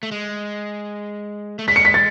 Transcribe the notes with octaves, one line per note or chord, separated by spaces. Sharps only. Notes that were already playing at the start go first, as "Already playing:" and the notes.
A3
G#3
A3
G#3 B6
C#7
B6
A6